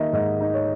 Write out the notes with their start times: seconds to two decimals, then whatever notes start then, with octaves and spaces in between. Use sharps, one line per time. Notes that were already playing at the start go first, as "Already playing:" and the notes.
Already playing: D#3 A#3 D#4 D#5 E5
0.13 G#2 D#5
0.40 D#4
0.54 C#5